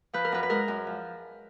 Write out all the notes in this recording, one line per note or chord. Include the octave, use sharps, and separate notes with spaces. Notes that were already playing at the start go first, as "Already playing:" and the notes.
F3 B4
A#4
F#2 B4
B4
G#3 A#4
F#2
F3